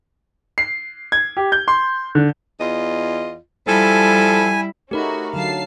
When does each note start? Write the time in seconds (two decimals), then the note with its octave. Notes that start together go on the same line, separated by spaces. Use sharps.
0.58 C7
1.12 G#6
1.37 G4
1.52 G6
1.68 C6
2.15 D3
2.60 E2 F4 D#5
3.68 F3 G3 E4 A4 G#5
4.91 A3 C#4 D#4 F#4 G4 A#4 B5
5.33 D3 F#3 F5 A5 C7